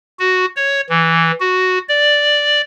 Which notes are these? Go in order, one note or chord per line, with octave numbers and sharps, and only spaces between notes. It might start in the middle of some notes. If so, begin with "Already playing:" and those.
F#4
C#5
E3
F#4
D5